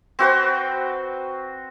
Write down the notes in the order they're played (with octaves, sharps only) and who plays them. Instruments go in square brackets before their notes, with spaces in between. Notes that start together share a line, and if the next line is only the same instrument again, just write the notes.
[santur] C4 F#4 B4 C5